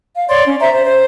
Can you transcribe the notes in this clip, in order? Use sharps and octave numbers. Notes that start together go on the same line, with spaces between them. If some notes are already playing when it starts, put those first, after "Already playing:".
F5
C#5 D5 C6
C#4
C5 E5 A#5
C5
C5